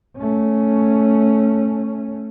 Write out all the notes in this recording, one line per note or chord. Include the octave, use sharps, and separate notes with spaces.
A3 C#4